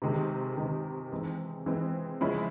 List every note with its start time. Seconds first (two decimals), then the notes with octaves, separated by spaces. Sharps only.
0.02 C3 D#3 G#3
0.57 C3 D#3 G#3
1.12 E3 G#3 C4
1.66 E3 G#3 C4
2.21 C#3 F3 G#3 C#4 E4